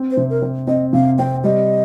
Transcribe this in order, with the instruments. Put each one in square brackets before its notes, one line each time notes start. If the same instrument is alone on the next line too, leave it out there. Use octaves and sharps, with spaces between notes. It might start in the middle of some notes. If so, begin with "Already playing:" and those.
Already playing: [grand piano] C4
[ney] C5
[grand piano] C3
[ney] A#4
[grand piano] C4
[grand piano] C4 [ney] D#5
[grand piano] C3 [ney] F5
[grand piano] C4 [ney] G5
[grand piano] G3 [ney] D#5